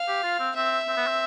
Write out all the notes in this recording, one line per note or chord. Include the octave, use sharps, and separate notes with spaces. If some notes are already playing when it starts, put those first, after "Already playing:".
Already playing: F5
G4
F4
C4
C4 E5
C4
B3
C4